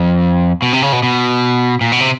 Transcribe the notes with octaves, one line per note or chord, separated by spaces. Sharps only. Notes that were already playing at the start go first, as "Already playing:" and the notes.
Already playing: F2
B2
C3
C#3
B2
B2
A#2
B2
C3